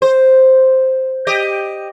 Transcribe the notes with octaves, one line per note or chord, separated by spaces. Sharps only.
C5
G4 D#5